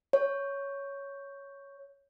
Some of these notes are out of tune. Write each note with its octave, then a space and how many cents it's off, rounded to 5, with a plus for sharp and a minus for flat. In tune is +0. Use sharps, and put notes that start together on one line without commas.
C#5 +5